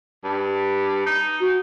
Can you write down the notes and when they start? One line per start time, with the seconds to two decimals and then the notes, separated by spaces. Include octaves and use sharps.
0.24 G2
1.06 D#4
1.40 F#4